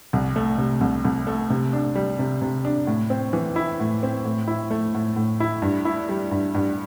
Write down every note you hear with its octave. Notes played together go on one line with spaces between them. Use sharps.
C2
A3
C3
C2
C2
A3
C3
D4
G3
C3
C3
D4
A2
C4
E3
E4
A2
C4
A2
E4
A3
A2
A2
E4
G2
E4
G3
G2
G2